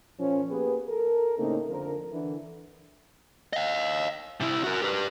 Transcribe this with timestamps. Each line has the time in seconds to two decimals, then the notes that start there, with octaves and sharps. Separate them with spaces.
0.19 A#2 F3 C#4
0.50 A#3 B3 G4 G#4 B4
0.89 A4 A#4
1.39 A2 C#3 A3 A#3 C4 D#4
1.69 F2 D3 F3 A#4
2.12 D3 E3
3.53 D#5 F5
4.40 C3 E4
4.64 F#4 A#4
4.82 G4 B4